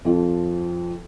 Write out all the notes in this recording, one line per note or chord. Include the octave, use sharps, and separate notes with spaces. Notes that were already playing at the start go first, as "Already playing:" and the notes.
F2 F3